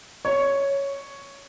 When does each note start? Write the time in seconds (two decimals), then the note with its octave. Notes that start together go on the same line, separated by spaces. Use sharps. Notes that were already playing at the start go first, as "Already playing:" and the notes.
0.25 C#5